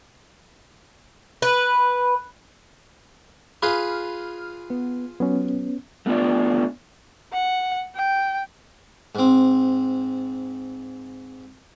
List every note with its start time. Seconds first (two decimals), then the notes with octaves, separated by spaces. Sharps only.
1.42 B4
3.62 F4 G#4 B4 B5 F6
4.70 B3
5.20 F#3 B3 C#4
6.06 A3 B3 D4 F4 D5
7.33 F#5
7.95 G5
9.15 G#2 C4